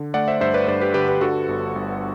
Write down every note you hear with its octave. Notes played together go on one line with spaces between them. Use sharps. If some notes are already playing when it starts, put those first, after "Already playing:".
Already playing: D3
A3 D5 F#5
C5 E5
G2 C5 E5
B4 D5
G2 B4 D5
G4 B4
D3 G4 B4
G4 B4
D3 F#4 A4
G1
G1